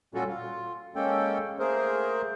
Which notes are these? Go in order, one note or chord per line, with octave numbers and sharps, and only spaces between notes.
A#2 G3 C#4 F4 F#4 A4
F4
G#3 A#3 C#4 A4 G5
A3 A#3 G#4 A#4 C5